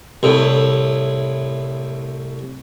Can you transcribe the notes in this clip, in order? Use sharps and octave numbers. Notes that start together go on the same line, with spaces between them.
C2 A2